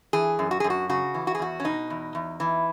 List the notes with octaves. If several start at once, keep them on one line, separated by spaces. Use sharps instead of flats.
E3 G#4
F#2
F#4
F#2 G#4
F#4
C#3 F#4
E3
F#4
G#4
E2 F#4
C#4
B2 D#4
E2
E2
E3